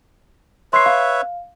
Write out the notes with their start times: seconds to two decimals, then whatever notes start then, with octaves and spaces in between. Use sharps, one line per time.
0.73 B4 C#5 E5 C6 C7
0.86 F5